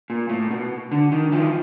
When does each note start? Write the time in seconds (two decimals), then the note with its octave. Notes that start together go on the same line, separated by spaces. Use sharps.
0.10 A#2
0.29 A2
0.50 B2
0.92 D3
1.12 D#3
1.32 D#3 F3